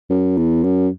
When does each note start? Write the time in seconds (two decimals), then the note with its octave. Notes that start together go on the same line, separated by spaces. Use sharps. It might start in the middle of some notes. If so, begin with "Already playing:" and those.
0.10 F#2
0.37 E2
0.64 F#2